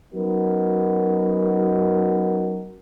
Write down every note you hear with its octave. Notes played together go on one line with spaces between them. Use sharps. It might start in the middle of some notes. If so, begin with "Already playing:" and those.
F#3 B3 C#4 D#4 F#4 A#4